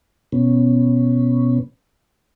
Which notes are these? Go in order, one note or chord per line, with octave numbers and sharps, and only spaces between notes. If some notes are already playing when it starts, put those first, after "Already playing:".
B2 B3 C#4